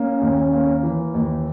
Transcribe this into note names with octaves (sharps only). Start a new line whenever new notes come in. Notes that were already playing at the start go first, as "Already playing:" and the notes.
Already playing: A#3 C#4
D#2
A#3
E3
D#2